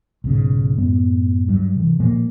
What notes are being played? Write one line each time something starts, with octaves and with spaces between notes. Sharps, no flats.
B1 G#2 C#3
F#2 A2 G#3 B3
G2 F#3
C3 E3
A#2 F3 G#3 A#3